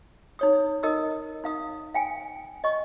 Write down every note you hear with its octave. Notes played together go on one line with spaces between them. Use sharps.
D#4 C#5 D#6
D#4 A#4 D#5 D#6 E6
D#4 F5 D#6
F5 G5 G#5
D#5 C#6